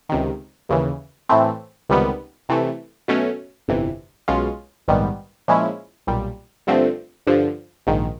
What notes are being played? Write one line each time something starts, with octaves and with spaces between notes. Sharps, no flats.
C#2 C3 D#3
D#2 C#3 E3
A2 E3 A3 C4
C#2 C3 D#3 G3 B3
C3 E3 A3
B2 F#3 A3 C#4
G1 F2 C3 E3
B1 B2 G#3 C#4 F4
A#1 G#2 D#3 G3 B3
A#2 F3 G#3 C#4 E4
B1 A#2 G3
G2 D3 F3 A3 C4
G2 D3 F3
A#1 G#2 D#3